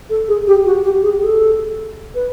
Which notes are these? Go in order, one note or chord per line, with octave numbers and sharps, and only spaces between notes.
A4
G#4
G4
F#4
G4
G#4
A4
B4